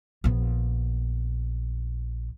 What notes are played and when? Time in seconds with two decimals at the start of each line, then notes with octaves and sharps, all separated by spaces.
0.24 A#1 B3